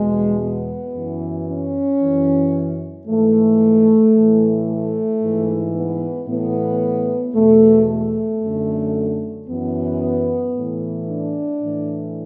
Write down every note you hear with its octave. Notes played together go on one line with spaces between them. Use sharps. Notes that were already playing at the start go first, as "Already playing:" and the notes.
Already playing: E2 B2 G#3
B3
F#2 E3
C#4
F#2 E3
G#2 E3 A3
A2 E3
A3
G#2 E3
B3
A2 E3 B3
E2 B2 A3
A3
F#2 D3
F#2 E3 B3
A2 E3
D4
A2 E3